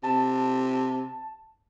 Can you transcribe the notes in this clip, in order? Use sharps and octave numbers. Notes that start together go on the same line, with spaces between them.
C3 A5